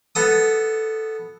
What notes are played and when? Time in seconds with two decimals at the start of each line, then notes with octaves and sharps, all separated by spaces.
0.15 B3 A4 D#6